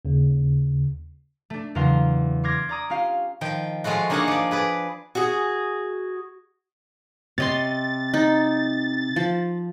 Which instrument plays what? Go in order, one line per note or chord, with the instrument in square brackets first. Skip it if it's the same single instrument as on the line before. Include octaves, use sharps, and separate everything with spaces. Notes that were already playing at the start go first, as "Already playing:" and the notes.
[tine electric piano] D#2 C#3
[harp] A3 D4
E2 C#3 F#3 A#4 F5 C6
C6 D6 F6 G#6 A#6
D5 A#5 D#6
C#4 F4 G4 F5
[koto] D#3 F3 G5
F3 G#3 A3 F4 F#4
A#3 D4 D#4 G#4 F5 F#5
F3 D5
G#4 B4 D5
[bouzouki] F#4 G#4
[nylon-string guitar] C3 [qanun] C#5 D#5 C6 [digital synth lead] A6
[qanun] D#4
F3